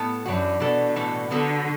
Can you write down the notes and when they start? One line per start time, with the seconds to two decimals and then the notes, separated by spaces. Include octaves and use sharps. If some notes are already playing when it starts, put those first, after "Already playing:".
Already playing: A2 B3 A4
0.26 F#2 E3 D4 F#4
0.60 B2 E3 D4 A4
0.96 A2 E3 D4 A4
1.31 D3 F#3 B3 F#4 A4